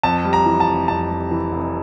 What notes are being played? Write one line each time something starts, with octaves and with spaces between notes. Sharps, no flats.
F2 A5
G3
A#5
E3
A5
F1
F2 A5
G3
E3
F1